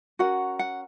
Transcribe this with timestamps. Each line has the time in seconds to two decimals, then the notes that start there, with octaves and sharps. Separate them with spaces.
0.19 C#4 F#4 A#4 F#5
0.59 F#5